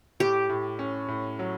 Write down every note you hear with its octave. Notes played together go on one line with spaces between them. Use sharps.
A2 G4
A2
C#4
A2
F#3